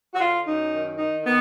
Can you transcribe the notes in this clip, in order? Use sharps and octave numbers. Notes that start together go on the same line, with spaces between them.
F#4
D3 F4
F#2 D#4
D#3
D#3 D#4
D#3 B3